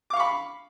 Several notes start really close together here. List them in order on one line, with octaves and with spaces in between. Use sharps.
D6 F5 C#6 B5